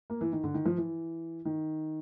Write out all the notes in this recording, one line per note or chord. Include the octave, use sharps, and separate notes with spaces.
A#3
E3
D#3
D3
D#3
F3
E3
D#3